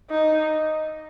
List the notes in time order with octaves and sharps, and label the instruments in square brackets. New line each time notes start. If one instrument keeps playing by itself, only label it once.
[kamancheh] D#4 [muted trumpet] D#5